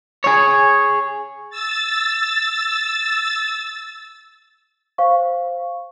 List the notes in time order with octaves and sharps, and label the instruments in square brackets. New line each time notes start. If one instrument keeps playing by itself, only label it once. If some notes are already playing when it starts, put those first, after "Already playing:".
[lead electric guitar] G#4 C#5
[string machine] E6 A6
[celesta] C5 F5 C#6